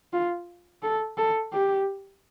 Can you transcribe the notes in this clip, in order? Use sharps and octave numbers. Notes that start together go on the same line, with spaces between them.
F4
A4
A4
G4